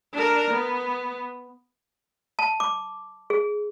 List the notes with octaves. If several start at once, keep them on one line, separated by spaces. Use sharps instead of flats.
D4 A#4
B3
A5
D6
G#4